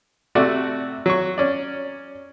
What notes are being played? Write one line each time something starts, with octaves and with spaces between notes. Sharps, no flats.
C3 A3 F#4 D5
F#3 C#6
C#4 D5